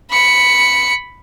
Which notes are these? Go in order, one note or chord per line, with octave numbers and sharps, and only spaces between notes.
B5 C#7